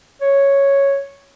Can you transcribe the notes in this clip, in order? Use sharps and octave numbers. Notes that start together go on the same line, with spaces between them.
C#5